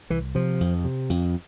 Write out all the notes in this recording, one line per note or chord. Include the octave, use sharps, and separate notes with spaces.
C2 E3
C3 F3
F2
C3
F2